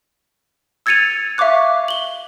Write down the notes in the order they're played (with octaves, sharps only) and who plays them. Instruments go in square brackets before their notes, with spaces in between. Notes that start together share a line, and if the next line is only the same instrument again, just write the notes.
[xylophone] E6 G#6 A6 C#7 D#7 F7
E5 F5 C#6 D6 F#6
F#7 G7